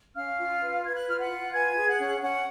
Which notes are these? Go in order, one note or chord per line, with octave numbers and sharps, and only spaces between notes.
C#4 F5 F6
F4
B4
B4 G#6
F#6
F4 F6
F#5 F#6
F4
B4 G#5 G#6
G#4
F#5 F#6
C#4
C#4 F#5 F#6